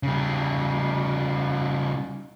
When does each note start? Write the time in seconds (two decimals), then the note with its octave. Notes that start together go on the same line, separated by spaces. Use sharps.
0.03 C#3 G3